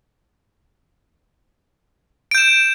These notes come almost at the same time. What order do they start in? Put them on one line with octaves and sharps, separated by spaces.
D7 G6 E7